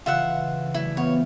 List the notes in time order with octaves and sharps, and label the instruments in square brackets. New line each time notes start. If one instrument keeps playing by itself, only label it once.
[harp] C#3 E3 [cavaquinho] F4 E5 F#5
[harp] F#3 G3 A3 [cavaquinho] E4
[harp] E3 C4 F4 [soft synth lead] B3 [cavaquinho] C#5